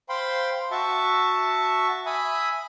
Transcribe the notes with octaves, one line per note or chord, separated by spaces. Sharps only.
C5 F5 G5 B5 C6
F#4 E5 A5 C#6
E5 G#5 B5 D#6